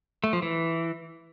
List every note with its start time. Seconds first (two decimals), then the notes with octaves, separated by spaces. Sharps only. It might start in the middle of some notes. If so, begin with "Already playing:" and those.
0.24 A3
0.33 F3
0.42 E3